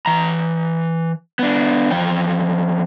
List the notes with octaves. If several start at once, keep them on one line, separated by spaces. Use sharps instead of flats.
E3 A#5
B3 D4
E2 F3 G5